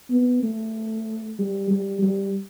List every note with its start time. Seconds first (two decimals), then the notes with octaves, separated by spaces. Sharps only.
0.10 B3
0.43 A3
1.39 G3
1.71 G3
2.03 G3